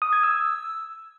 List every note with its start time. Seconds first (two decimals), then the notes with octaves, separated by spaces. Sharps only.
0.02 D#6
0.13 G#6
0.23 E6